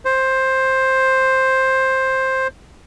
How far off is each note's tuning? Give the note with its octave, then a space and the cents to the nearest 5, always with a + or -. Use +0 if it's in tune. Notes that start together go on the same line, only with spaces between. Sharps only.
C5 +10